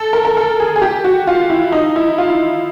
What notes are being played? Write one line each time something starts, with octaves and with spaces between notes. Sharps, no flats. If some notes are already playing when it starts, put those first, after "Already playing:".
Already playing: A4
A#4
A#4
A4
G#4
G#4
G4
F#4
F4
E4
D#4
E4
F4